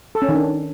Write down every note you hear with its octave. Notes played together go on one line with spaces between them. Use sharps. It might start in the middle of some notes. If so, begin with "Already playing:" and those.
A4
C#4
D#3
D4